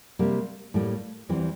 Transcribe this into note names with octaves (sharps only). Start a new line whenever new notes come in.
C3 G3 A#3
A2 G3 A#3
E2 E3 G3 C4